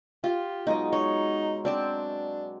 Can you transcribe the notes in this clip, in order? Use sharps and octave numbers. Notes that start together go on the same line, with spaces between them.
F4 G4
B2 F#3 G#3 D#4 D#5
D#4 C#5
C4 D4 D5 A5